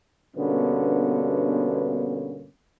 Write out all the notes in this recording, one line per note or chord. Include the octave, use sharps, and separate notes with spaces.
G2 B2 D3 A#3 B3 C#4